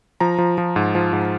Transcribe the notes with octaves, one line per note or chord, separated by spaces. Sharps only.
F3 A#5
F3
F3
G#2
F3
G#2